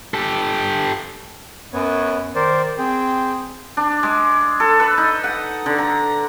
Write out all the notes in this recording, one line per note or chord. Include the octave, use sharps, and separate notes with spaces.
G4 A4
F#2 B3 B4 C#5
D#3 A#4 C5 D5
C4 G#4 G5
D4
G#3
A4
B4
D#4
F#5
D3
A#5